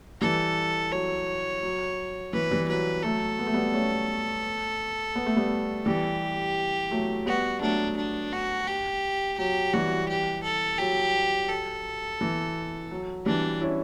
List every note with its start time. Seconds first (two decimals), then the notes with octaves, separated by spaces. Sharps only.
0.21 E3 G3 A4
0.92 F#3 C#5
1.62 F#3
2.33 E3 B4
2.50 E3 G3
2.68 F#3 B4
3.03 F#3 A3 A4
3.39 B3
3.46 A3
3.54 G3 B3
3.74 A3 C#4
5.15 B3
5.26 A3
5.36 G3 B3
5.86 E3 G3 G4
6.91 F#3 A3
7.26 G3 B3 F#4
7.61 F#3 A3 D4
7.97 D4
8.33 F#4
8.67 G4
9.38 F#3 G4
9.74 E3 G3 F#4
10.09 G4
10.43 A4
10.79 F#3 G4
11.49 A4
12.21 E3
12.91 F#3
13.26 E3 G3 D4
13.61 C#4 E4